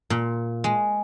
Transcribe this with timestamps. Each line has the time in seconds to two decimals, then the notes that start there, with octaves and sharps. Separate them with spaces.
0.10 A#2
0.64 G#3